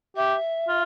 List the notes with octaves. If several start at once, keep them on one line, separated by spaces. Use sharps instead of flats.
G4 E5
F4